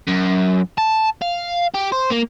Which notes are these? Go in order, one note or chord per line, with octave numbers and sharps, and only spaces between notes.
F#2
A5
F5
G4
C5
A#3